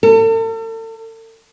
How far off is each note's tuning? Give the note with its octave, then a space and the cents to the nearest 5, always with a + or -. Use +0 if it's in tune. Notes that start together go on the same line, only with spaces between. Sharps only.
A4 +40